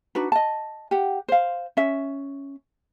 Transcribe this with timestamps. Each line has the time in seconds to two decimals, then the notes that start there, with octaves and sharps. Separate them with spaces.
0.15 D4 D#4 F#4 B4
0.32 D#5 A5
0.91 G4 F#5
1.29 C5 F5
1.77 C#4 E5